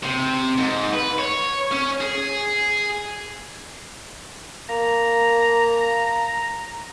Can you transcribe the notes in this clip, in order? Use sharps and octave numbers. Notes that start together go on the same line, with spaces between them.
C3
G#2
B4
C#5
C#4
G#4
A#3 A#5